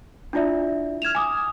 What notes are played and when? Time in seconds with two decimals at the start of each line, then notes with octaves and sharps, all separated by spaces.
0.33 D4 E4 F4 D5 E5
1.02 F6 G#6 E7 F7
1.15 G#5 D6 D#6